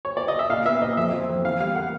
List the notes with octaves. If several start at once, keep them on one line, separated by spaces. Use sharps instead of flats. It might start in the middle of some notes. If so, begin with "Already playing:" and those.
C#5
D5
D#5
E5
A#2 F5
B3 E5
A#2 D#5
F2 E5
F3
F2
E2 F5
G3 F5
A#3 F#5